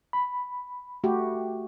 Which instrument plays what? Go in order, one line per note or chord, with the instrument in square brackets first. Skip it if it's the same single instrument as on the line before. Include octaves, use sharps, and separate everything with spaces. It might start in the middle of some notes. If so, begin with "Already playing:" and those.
[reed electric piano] B5
[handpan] A3 F#4 G4